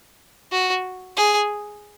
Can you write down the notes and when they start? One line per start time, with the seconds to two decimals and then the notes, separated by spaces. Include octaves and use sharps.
0.52 F#4
1.17 G#4